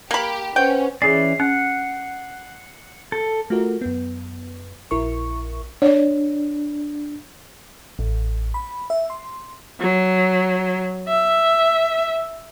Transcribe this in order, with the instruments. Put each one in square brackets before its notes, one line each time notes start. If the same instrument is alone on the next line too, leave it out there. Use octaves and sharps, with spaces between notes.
[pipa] A#3 B5 [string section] G4
[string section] C#4 [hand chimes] B4 C5 F#5 [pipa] G5
[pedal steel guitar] E3 C#4 D5 [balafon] G#4 G#5 [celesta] C7
[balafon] C#4 [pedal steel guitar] F#5
[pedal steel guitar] A4
[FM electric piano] A3 F4 F#4 A#4
F#2 B3
A#1 E4 A#4 C#6
[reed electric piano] D4 [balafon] C#5 D5
[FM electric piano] A1
B5
E5
C6
[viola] F#3
E5